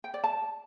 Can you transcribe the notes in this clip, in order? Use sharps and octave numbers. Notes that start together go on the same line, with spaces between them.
G5
D5
A5